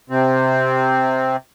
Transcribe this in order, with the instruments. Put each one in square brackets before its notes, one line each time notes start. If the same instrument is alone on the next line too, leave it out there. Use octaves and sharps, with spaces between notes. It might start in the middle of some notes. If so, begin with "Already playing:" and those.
[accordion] C3 C4